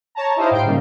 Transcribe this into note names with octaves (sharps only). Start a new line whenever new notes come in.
C#5 A5 A#5
D#4 E4 G4 C5 D#5 F5
G#2 G5 C6 D7
C#3 G3 A#3 D#4